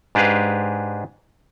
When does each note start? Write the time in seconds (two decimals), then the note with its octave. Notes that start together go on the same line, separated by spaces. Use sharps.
0.15 G#2 D4 G4 G#4 B4 F5